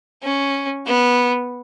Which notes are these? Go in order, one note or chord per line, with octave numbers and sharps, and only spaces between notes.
C#4
B3